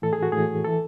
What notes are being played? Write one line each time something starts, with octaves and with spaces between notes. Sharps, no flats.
A2 E3 A4
G#4
F#4
A2 E3 G#4
E3 A4